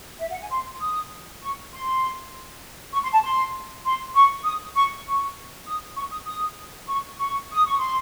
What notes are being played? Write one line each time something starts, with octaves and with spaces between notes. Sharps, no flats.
E5
F#5
G#5
C6
D#6
C#6
C6
C#6
C6
A5
C6
C6
C#6
D#6
C#6
C#6
D#6
C#6
D#6
D#6
C#6
C#6
D#6
C#6
C6